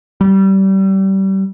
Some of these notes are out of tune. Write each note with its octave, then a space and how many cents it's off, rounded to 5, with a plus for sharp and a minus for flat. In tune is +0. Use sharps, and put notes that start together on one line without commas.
G3 -25